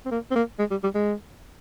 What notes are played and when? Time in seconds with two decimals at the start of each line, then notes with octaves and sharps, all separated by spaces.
0.06 C4
0.11 A#3
0.31 C4
0.35 A#3
0.59 G#3
0.71 G3
0.83 G3
0.95 G#3